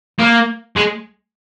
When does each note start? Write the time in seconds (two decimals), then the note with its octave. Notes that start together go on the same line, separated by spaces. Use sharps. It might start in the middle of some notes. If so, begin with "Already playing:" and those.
0.19 A#3
0.76 G#3